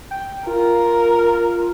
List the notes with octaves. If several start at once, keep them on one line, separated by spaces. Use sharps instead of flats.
G5
F4 A#4